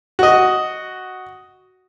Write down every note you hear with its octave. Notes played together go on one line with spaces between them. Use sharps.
F#4 D#5